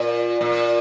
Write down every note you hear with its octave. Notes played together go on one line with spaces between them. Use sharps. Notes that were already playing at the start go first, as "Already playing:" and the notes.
Already playing: A#2
A#2